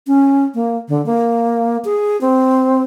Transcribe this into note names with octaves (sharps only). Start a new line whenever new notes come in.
C#4
A#3
D3
A#3
G#4
C4